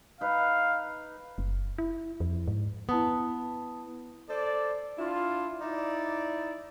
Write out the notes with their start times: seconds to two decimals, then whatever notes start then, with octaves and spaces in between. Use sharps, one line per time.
0.21 D#4 B4 F5
1.38 F#1
1.78 E4
2.20 F2
2.47 G#2
2.89 B3 E4 A5 D#6
4.29 A4 C5 D5
4.98 D4 E4 F4
5.61 D#4 E4 D5